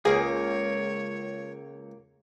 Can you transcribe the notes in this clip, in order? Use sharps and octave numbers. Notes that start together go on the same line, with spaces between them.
C#2 A#3 G#4 C#5